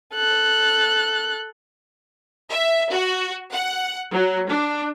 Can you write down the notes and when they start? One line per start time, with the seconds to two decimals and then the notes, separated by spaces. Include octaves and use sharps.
0.15 A4 F#6
2.50 E5
2.91 F#4
3.52 F#5
4.13 F#3
4.47 D4